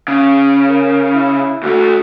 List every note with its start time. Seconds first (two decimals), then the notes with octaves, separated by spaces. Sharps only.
0.08 C#3
0.68 A#4
1.14 E4
1.63 D2 A3 F#4